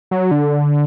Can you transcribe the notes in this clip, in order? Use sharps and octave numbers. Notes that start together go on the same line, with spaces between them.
F#3
D3